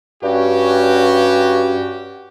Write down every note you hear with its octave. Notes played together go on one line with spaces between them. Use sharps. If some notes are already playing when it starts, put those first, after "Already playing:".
G2 C#4 F#4 G4